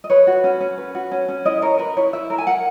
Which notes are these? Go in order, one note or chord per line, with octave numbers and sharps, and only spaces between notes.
D#5
B4 C#5
F#4
C#4
C#4
B4
F#4
C#4
C#4
E4 D#5
A#4 C#5
A#4 B4
E4 C#5
E4 E5
A#4
G#5
A#4 F#5